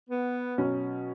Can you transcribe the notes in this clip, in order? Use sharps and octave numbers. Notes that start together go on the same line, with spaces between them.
B3
B2 F#3 C#4